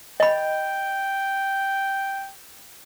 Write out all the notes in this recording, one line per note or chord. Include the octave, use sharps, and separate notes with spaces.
D#5 G5 B5